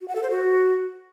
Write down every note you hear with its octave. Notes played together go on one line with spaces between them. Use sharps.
F#4
F#5
A4
C5
F#4